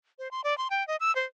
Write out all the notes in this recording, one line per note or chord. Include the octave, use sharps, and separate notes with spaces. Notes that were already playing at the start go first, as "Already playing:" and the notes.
C5
C6
D5
C6
G5
D#5
E6
C5